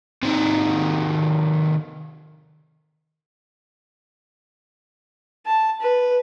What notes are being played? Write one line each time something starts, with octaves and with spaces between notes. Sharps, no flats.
C3 D#3
A5
B4